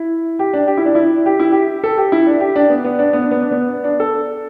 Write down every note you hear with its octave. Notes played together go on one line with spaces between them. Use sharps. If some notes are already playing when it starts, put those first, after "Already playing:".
Already playing: E4
G4
D4
G4
E4
D4
E4
G4
E4
G4
A4
G4
E4
D4
G4
D4
B3
B3
D4
B3
D4
B3
D4
B3
D4
A4